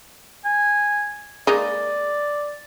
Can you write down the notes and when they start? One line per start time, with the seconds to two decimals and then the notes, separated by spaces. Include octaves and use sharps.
0.45 G#5
1.47 G#3 A#3 D#4 D5